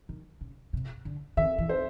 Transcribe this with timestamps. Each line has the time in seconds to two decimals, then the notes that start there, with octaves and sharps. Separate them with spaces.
0.09 D#3
0.41 C#3
0.73 C3
1.05 D3
1.37 D#3 E5
1.58 E3
1.69 C5